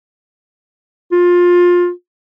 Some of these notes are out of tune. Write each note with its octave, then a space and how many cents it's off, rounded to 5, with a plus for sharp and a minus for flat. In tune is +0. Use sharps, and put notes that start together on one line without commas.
F4 +20